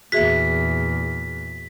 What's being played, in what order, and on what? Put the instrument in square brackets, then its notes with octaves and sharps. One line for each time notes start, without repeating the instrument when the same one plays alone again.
[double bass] E2 A#2 [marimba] F#4 G#4 E5 [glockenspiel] B6